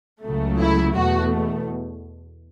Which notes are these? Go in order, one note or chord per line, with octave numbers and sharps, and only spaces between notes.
C#2 C#3 F#3 A3
E4
E2 B2 A3 F#4